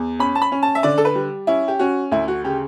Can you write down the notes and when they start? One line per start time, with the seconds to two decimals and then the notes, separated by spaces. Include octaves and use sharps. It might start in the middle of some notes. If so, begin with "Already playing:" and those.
Already playing: E2
0.19 C#4 B5
0.35 A5
0.42 B5
0.52 C#4
0.63 A5
0.75 E5
0.83 D3 D5
0.98 A4
1.05 B4
1.15 G3
1.47 C#4 E4
1.68 G4
1.79 C#4 F#4
2.11 D2 E4
2.28 F#4
2.44 C#3 G4